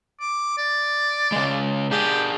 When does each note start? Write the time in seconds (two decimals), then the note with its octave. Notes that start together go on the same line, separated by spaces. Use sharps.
0.21 D6
0.57 D5
1.32 C#3 G#3
1.91 D4 G4 G#4